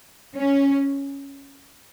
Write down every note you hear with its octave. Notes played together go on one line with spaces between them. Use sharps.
C#4